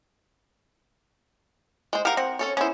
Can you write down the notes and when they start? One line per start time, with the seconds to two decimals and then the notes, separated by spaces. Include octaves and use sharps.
1.93 G#3 C5
2.05 G4 A#4 F5 F#5
2.17 C4 F#5
2.39 C#4 A4 C#5
2.57 B3 C#4 E4 C5